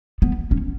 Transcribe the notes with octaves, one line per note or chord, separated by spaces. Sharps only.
B3
C#4